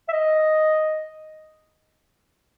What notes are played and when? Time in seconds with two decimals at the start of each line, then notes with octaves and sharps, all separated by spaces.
0.08 E5
0.12 D#5